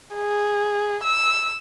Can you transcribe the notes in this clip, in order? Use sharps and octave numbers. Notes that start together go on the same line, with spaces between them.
G#4
E6